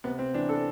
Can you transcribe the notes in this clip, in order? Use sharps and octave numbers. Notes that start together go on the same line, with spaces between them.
C3 B3
C4
E3 D4
A4